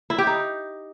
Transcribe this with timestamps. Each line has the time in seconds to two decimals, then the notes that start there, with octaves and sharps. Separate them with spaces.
0.10 E4
0.18 G4
0.27 D#4